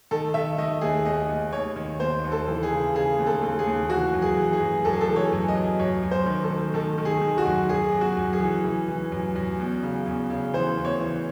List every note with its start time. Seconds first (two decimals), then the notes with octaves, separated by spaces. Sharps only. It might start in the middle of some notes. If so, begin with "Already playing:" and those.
0.11 D#3 A4
0.34 D#3 E5
0.58 D#3 D#5
0.81 D#2 G#4
1.05 D#2 D#5
1.29 D#2
1.53 D#2 C#5
1.76 D#3
2.00 D#2 C5
2.24 D#2
2.32 A4
2.48 E3
2.63 G#4
2.71 C#3
2.95 C#3 G#4
3.19 D#2
3.26 A4
3.42 D#2
3.59 G#4
3.67 D#2
3.90 E3 F#4
4.14 F#2
4.22 G#4
4.37 E3
4.53 G#4
4.61 F#2
4.85 F#2 A4
4.93 G#4
5.01 A4
5.09 E3
5.16 C#5
5.33 F#2
5.48 D#5
5.55 F#2
5.79 F#2 C#5
6.03 F#2
6.11 C5
6.26 D#3
6.43 A4
6.50 D#3
6.74 D#3 A4
6.98 D#3
7.05 G#4
7.21 D#3
7.38 F#4
7.46 F#2
7.69 F#2 G#4
7.92 F#2
8.01 F#4
8.17 F#2
8.33 G#4
8.40 E3
8.64 E3
8.88 E3
9.12 F#2
9.36 F#2
9.59 E2
9.83 C#3
10.06 E2
10.30 C#3
10.54 E3 C5
10.77 E2
10.85 C#5
11.00 E3